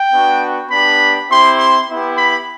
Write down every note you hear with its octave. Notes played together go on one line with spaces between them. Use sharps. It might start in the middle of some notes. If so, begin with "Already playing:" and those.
Already playing: G5
B3 D4 F#4
B3 D4 G4 B5
C4 E4 G4 C6
C6
B3 E4 G4
B5